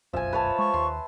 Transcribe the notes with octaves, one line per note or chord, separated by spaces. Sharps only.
F1 B1 F#2 F3 E5 G#5
B4 C#5 A5
G#3 C#6
D#2 C6